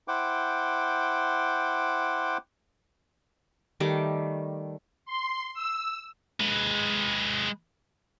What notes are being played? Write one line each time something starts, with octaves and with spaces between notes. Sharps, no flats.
E4 C5 F#5 G5 D6
D#3 G3 A3 D6
C6
E6
G#3 B4